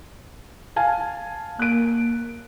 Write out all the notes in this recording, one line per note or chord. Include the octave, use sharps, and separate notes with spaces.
F5 G#5 A5
A#3 F#6 D7